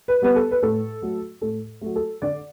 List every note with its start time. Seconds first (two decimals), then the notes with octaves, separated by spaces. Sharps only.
0.08 B4
0.22 G3 B3 B4
0.36 A4
0.51 B4
0.63 A2 A4
1.02 F#3 A3
1.41 A2 A4
1.81 F#3 A3
1.96 A4
2.22 D3 D5